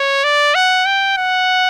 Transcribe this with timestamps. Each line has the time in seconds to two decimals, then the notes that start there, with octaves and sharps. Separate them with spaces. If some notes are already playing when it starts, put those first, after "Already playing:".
Already playing: C#5
0.24 D5
0.55 F#5
0.86 G5
1.17 F#5